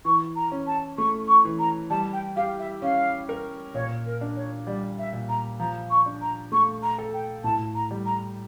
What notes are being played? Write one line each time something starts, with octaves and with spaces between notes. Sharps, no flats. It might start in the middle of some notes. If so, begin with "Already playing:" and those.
E3 C#6
A#5
C#4
A5
A3 C#6
C#6
E3
A#5
G3 A5
G5
G4 F5
E5
C#4 F5
A#4
A#2 C#5
A#4
D4
C#5
G3 D5
E5
A#2
A#5
F3 A#5
C#6
D4
A#5
A3 C#6
A#5
A4
G5
A2 A5
A#5
G3
A#5